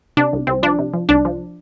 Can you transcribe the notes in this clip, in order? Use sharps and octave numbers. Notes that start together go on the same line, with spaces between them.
C3 D4
C2
C2 C4
F3 D4
C3
F3
C2 D4
F3